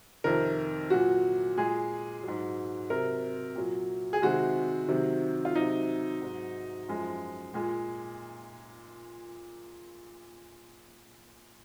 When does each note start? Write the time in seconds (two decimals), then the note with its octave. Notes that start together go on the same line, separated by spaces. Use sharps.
0.24 F2 C3 D#3 A#4
0.90 A#2 F#3 F#4
1.57 A#2 G#3 G#4
2.24 G#2 F#3
2.90 C3 F#3 A#4
3.56 A#2 F#3
4.13 G#4
4.22 C3 D#3 G#3 F#4
4.88 C3 D#3 F#3
5.45 F4
5.55 C3 F#3 D#4
6.22 G#2 F#3
6.88 F#2 F3 G#3
7.54 A#2 G#3